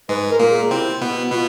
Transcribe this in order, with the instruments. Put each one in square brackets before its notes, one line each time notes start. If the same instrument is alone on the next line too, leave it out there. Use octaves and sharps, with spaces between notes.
[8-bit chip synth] G#2 G#3 [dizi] B4
[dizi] A#4
[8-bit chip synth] A#2 A#3
[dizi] G#4
[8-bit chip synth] C3 C4 [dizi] E4
[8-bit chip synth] B2 B3
[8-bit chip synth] B2 B3 [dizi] F4